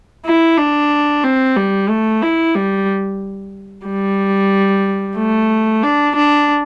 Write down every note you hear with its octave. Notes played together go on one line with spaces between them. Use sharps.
E4
D4
C4
G3
A3
E4
G3
G3
A3
D4
D4